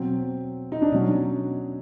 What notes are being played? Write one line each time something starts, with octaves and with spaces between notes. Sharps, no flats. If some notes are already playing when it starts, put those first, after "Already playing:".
Already playing: B2 F#3 C4
D#4
D4
B2 F#3 C#4